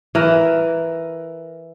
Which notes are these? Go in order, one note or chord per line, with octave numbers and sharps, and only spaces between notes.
E3 A#4